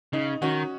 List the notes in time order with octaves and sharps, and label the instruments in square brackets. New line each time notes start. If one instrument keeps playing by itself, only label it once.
[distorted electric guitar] C#3 [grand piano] D#4
[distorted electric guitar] D#3 [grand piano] C#4 F#4